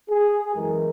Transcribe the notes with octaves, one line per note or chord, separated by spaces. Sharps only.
G#4
F#2 E3 G#3 A#4